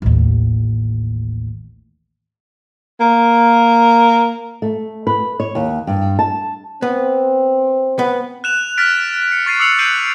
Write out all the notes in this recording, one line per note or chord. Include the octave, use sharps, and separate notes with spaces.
A1 D#2
A#3
A3
B4
C#5
D#2
G2
A5
B3 C4
B3
F#6 E7 F7
F6 A6 B6 D7
C#7
C#6 A6 C7 D#7
D6 E6 C7 C#7 F7 F#7
F#6 G6 C7 D7 D#7 F#7